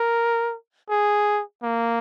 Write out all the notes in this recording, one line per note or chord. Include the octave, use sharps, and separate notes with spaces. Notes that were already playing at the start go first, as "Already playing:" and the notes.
Already playing: A#4
G#4
A#3